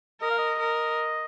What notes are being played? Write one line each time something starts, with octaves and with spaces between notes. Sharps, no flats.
A#4 D#5
F5
D#5
A#4